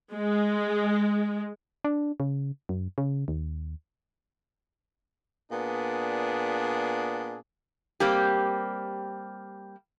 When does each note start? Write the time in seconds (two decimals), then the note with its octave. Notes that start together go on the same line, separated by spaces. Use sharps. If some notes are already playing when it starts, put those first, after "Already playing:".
0.13 G#3
1.84 D4
2.20 C#3
2.69 F#2
2.98 C#3
3.28 D#2
5.52 A#2 B3 D4 G#4
8.00 G3 A#3 C4 G4